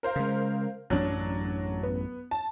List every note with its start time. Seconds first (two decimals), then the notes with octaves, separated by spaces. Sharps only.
0.03 A#4 C5 F5
0.16 C#3 G#3
0.90 A1 F#2 F#3 D4
1.83 B3
2.31 A5